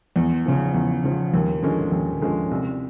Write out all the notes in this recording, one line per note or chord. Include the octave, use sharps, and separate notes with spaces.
E2
C#3 F3
E2
C#3 F3
D#2
D3 F3 G#3 C#4
D#2
D3 F3 G#3 C#4
C2